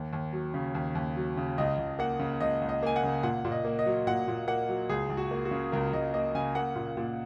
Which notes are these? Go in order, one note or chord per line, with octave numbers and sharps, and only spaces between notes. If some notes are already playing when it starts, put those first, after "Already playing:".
Already playing: D#2
D#2
F#3
C#3
D#2
D#2
F#3
C#3
C#2 D#5
C#2
A#3 F#5
C#3
C#2 D#5
C#2
D#5
A#3 G#5
F#5
C#3
A#2 F#5
A#2
D#5
A#3
D#5
F#3
A#2 F#5
A#2
A#3 F#5
F#3
C#2 G#4
C#2
F#4
A#3
F#4
C#3
C#2 A#4
C#2 D#5
A#3 D#5
C#3 G#5
A#3 F#5
A#2
A#2